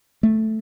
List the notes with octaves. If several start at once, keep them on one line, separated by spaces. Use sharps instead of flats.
A3